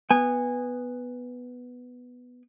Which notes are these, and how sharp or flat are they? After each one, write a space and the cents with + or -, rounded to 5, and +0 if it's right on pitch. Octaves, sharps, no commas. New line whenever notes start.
B3 +0 G#5 -15